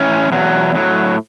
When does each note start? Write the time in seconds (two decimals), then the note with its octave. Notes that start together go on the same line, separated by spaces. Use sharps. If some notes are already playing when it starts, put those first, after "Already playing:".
Already playing: A2 E3 C#4
0.32 E2 B2 F#3
0.75 A2 F#3